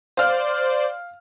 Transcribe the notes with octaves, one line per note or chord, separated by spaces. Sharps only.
C5 D5 F5 F6